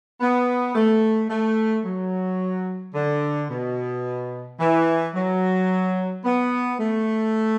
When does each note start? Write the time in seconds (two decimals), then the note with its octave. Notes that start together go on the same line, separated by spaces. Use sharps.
0.21 B3
0.75 A3
1.30 A3
1.85 F#3
2.95 D3
3.50 B2
4.60 E3
5.15 F#3
6.25 B3
6.79 A3